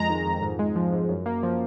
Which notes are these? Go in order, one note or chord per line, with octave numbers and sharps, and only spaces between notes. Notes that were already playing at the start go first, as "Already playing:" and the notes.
Already playing: F2 G#3 A#5
D#3
F2
G#2
G#3
F3
G#2
F#2
A#3
F3